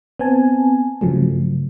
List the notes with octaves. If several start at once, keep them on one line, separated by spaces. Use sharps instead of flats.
B3 C4 G#5 A5
G2 C#3 F3 F#3 A3